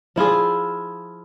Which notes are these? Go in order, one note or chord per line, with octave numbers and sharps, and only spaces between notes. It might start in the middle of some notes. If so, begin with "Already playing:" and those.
F3 E4 F4 G#4